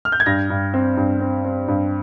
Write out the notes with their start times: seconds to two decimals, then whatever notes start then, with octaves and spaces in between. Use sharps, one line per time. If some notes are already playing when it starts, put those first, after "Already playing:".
0.05 F6
0.12 G6
0.20 G#6
0.26 G2 A#6
0.50 G2
0.74 C4
0.97 G2
1.20 C4
1.44 C4
1.68 G2